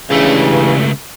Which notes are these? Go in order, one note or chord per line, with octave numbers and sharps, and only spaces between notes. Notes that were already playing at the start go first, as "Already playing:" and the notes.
C#2 G2 C#3 E3 A3